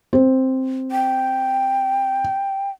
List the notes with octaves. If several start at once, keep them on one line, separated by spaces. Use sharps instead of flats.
C4
G5